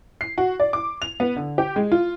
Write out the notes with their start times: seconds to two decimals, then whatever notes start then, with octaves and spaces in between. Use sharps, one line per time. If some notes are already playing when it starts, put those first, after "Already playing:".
0.21 C7
0.38 F#4
0.60 D5
0.73 D6
1.02 F7
1.20 B3
1.36 D3
1.58 G4
1.76 G#3
1.92 F4